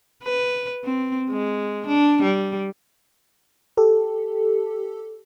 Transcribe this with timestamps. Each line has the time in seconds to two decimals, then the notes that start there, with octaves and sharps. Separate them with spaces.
0.24 B4
0.84 C4
1.30 G#3
1.87 D4
2.22 G3
3.77 G4 A4